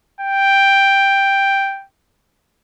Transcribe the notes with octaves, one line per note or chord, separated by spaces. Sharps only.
G5